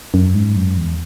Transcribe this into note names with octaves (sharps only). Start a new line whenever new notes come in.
F#2
G#2
F#2
E2